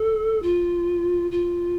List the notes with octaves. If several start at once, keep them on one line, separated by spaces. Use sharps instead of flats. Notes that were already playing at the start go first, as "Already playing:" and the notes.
Already playing: A4
F4
F4